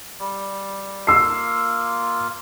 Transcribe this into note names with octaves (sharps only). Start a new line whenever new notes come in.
G3
A#3 F4 E6 C7